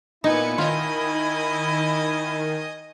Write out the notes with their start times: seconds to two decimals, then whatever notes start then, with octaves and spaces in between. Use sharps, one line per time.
0.24 A#2 B3 D#4 E4 B4 G#5 C#7
0.58 D#3 F4 D#5 G#5